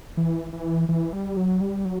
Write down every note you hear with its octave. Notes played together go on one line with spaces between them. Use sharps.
E3
E3
E3
G3
F#3
G3
F#3